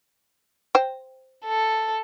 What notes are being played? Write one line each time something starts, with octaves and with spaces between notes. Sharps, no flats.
C5 G5
A4